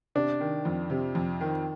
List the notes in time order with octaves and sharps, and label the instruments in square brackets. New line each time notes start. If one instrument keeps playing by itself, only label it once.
[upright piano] C3 [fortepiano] D4
[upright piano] D#3
F2
C3
F2
D#3